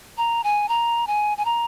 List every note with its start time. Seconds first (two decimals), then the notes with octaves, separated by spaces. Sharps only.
0.18 A#5
0.44 G#5
0.69 A#5
1.07 G#5
1.38 G#5
1.45 A#5